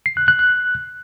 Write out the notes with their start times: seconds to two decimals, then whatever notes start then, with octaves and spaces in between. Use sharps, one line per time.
0.06 C7
0.17 F#6
0.28 F#6
0.39 F#6